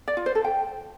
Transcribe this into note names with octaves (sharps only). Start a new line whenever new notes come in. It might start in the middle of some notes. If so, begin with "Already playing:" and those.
D5
F4
C5
A4
G5